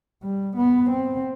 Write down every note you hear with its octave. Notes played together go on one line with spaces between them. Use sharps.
G3
B3
C4